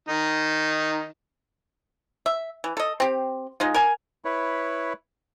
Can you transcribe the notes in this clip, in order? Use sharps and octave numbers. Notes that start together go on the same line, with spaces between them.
D#3 D#4
E5
E3
A4 D#5
C4 G4
G#3 D#4 F4
A#4 G#5
E4 B4 C#5